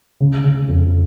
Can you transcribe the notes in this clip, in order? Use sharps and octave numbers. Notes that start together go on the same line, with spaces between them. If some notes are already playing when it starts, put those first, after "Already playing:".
C#3
C#3
F2